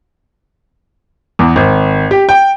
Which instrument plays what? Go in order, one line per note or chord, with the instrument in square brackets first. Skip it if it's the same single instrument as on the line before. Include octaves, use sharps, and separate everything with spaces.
[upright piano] E2
G#1
G4
G5